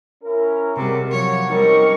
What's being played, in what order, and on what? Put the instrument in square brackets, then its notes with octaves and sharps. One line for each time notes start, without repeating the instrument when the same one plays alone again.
[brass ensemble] C#4 E4 A#4
[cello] C3 G3 [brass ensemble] G#3 F#4 A#4
[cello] F3 C#5 [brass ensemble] F#3
[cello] G3 [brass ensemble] C4 C#4 D#4 [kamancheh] A#4 C#6